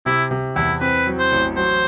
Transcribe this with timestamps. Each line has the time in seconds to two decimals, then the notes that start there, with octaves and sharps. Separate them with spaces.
0.06 C3 E4
0.31 C3
0.56 E2 E4
0.81 C4 B4
1.07 F#3
1.19 C5
1.32 A1
1.57 F#3 C5